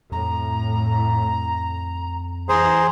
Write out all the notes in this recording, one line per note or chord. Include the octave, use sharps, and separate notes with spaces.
F2 A2 A#5
E3 G#4 C5 A#5